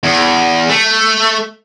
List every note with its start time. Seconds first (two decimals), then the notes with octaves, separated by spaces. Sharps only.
0.03 E2
0.69 A3